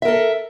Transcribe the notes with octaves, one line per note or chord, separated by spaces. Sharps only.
A4 A#4 E5